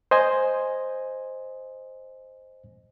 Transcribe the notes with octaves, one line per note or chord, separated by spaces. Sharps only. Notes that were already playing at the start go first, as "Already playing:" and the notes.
C5 D#5 G#5